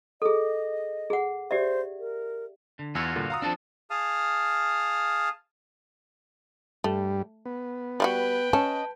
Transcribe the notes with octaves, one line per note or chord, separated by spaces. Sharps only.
G#4 A4 D#5
G#4 F#5
G4 C5 D5 E5
A#4
D3
E2 F4 F#4 C#5 E6 A6
G2 A#2 D3
F5 A#5 D#6
F3 C4 D4 A4 A5
G#4 F5 A5 D#6 F6
G2 G3 A3
B3
G3 F4 F#4 B4 G5
C#4 D#5 A5